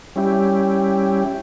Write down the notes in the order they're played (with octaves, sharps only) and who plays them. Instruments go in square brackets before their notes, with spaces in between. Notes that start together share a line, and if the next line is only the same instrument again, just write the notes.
[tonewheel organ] G3 C#4 E4 G4